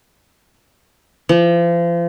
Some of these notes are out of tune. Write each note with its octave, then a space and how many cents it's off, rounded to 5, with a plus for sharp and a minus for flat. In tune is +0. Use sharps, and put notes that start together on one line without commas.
F3 -35